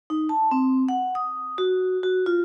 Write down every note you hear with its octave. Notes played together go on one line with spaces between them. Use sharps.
D#4
A5
C4
F#5
D#6
F#4
F#4
F4